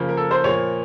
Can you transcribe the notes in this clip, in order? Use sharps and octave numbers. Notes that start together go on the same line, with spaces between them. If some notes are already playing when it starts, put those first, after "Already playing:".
Already playing: C#3 F3 A#3
A#4
A4
C5
A#2 F3 A#3 C#5